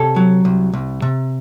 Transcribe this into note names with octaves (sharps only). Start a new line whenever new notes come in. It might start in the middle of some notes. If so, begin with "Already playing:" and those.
Already playing: C3 A4 C#5
F#3
C2
C2
C3